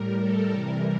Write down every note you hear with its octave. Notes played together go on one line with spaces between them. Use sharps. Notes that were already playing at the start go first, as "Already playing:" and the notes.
Already playing: A2 G3 A#4
A4
C3 E3 G3 A#4